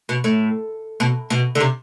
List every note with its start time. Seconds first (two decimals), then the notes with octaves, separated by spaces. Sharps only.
0.09 B2
0.24 A2
1.00 B2
1.30 B2
1.55 D3
1.60 C3